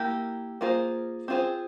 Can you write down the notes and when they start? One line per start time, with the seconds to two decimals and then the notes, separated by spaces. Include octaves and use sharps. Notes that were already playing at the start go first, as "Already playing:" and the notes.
Already playing: A#3 E4 G4 A#4
0.61 A#3 F4 G#4 C5
1.28 C4 F4 G#4 C5